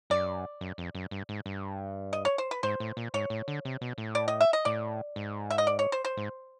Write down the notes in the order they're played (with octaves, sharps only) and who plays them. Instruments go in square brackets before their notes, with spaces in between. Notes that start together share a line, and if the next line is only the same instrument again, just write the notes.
[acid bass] F#2 [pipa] D5
[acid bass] F#2
F2
F#2
G2
G#2
G2
[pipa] D#5
C#5
C5
B4
[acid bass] G#2 [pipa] C5
[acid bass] A2
A#2
[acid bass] G#2 [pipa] C#5
[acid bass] A2
D3
C3
B2
A2
[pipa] D5
D#5
E5
D#5
[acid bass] A2 [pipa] D5
[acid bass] G#2
[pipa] E5
D#5
D5
C#5
C5
C5
[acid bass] G#2